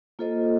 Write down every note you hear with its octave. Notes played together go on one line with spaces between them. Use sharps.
A#3 F4 A4 C5 D#5